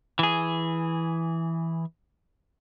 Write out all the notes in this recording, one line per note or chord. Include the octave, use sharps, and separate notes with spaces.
E3 G#4